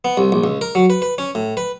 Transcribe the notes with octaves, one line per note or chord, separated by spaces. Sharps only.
B3
C2
A#1
C#2
A#4
F#3
B4
B4
C#4
A2
B4